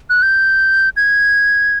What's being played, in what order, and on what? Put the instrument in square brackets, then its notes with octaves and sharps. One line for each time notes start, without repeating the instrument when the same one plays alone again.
[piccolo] F#6
G6
G#6